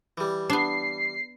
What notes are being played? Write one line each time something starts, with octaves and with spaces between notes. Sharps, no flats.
E3 G3
B3 D4 C7